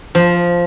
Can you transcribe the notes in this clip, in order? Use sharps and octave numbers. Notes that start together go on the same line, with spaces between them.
F3